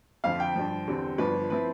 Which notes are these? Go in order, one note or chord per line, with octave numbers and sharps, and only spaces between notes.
F2 D3 F3 F5
G5
G2 D3 F3
E2 D3 G3 C4
G1 G2 F3 B4
F3 C4 E4 B4